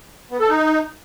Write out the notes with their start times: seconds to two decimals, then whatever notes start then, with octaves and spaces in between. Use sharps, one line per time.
0.31 B3
0.40 A4
0.48 D#4